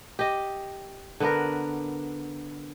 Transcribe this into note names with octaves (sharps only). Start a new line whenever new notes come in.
G4 D#5
D3 B3 A#4